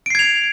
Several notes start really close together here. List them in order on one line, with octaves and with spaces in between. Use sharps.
D7 C7 G#6 F7